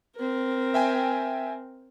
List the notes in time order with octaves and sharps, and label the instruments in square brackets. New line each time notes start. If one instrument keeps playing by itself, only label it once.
[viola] C4 A#4
[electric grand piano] E5 G5 G#5